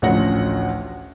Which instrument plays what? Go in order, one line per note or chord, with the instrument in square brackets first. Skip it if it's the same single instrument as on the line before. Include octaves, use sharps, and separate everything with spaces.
[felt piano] A1 D2 F3 C#4 F#5 A#6